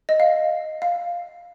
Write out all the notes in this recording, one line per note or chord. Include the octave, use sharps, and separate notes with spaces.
D#5
F5
F5